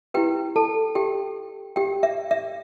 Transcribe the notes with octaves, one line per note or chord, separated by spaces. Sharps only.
E4 G4 B4 G5
A4 A5
G4 G5
G4 G5
E5
E5